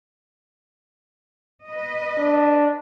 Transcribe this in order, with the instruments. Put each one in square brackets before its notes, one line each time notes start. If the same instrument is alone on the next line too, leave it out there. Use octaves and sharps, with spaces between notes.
[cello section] B4 D#5
[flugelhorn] D4